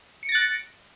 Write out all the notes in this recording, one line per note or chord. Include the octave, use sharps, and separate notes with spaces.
F#6 A6 A#6 C#7 D7